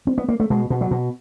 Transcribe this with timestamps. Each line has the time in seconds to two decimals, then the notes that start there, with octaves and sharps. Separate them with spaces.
0.07 C4
0.18 B3
0.29 A#3
0.40 A3
0.50 B2 G#3
0.70 B2
0.81 F#3
0.91 B2